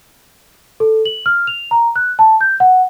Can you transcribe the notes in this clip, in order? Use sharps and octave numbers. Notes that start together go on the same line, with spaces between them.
A4
F#7
F6
F7
A#5
F#6
A5
G6
F#5